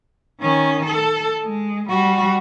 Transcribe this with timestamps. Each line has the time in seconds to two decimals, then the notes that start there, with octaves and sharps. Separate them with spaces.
0.41 D#3 C#4
0.86 A4
1.42 G#3
1.89 G3 F#4